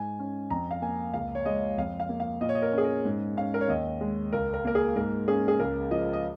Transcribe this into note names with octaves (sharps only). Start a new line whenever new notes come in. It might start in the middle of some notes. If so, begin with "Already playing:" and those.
Already playing: G#2 G#5
C#4
F2 A#5
F5
A#3 G#5
C#2 F5
C#5
G#3 D#5
F2 F5
F5
A#3
F5
A#2 D#5
C#5
D#5
A#4
C#4 G#4
A#4
G#2
C#4 F5
A#4
C#5
D#2 D#5
G#3
C#2 A#4
A#4
A#3 A#4
G#4
G#2 A#4
C#4 G#4
G#4
C#2 A#4
F3 D#5
D#5